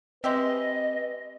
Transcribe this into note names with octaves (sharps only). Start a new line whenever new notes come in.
G#3 C4 G4 B4 D#5 E5